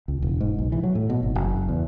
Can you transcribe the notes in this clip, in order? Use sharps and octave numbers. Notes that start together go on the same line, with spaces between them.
C#2
E1
G#2
B1
E3
F#3
A2
B2
G#1
F#1
E2